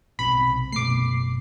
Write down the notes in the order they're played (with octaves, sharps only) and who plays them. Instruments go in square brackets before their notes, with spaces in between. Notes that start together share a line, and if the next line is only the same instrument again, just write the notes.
[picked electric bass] B1 C3 [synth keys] B5
[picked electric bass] F#1 B2 A3 [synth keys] D6 C7